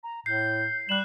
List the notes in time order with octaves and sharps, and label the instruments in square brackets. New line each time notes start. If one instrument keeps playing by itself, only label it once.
[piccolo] A#5
[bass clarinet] A2 [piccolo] G6 [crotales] C7
[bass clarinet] G3 [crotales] F#6 E7 [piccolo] F#7